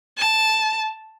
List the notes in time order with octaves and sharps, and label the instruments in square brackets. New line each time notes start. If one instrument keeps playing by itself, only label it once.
[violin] A5